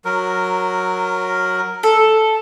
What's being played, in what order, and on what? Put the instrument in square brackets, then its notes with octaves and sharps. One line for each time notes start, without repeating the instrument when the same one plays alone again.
[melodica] F#3 A#4
[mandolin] A4